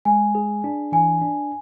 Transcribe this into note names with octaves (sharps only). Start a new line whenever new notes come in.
G#3 G#5
G#4
D4
E3 G#5
D4